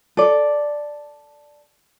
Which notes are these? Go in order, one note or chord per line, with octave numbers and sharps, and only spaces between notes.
A4 D5